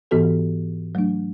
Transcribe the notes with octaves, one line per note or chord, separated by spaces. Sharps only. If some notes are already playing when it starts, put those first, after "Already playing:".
G#2 E3 B3 F#4 A4
F#3 A3 D4